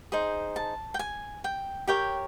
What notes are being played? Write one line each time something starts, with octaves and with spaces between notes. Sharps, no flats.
D#4 G#4 C5
A5
G5
G#5
G5
G4 A#4 C#5 G5